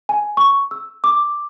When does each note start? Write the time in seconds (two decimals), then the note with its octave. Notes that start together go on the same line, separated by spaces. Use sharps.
0.09 G#5
0.37 C#6
0.71 E6
1.04 D6